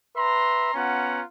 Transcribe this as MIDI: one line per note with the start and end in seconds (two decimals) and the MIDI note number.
0.16 0.71 71
0.16 0.71 76
0.16 0.71 82
0.16 0.71 84
0.74 1.22 59
0.74 1.22 61
0.74 1.22 65
0.74 1.22 78
0.74 1.22 82